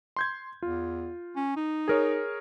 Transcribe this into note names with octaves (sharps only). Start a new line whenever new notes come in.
C6 G6 G#6
E2 F4
C#4
D#4
G#4 A#4 C#5